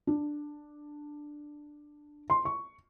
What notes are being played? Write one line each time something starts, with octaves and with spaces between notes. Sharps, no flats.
D4
C6
C#6